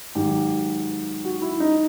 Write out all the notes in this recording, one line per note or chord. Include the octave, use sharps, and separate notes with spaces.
G#2 D#3 F#3 G4
F#4
E4
D#4